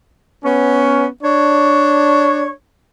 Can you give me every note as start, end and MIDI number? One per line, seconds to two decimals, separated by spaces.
0.44 1.06 59
0.44 1.06 61
1.23 2.49 62
1.23 2.49 73